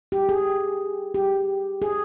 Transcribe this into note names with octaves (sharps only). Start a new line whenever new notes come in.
G4
G#4
G4
G#4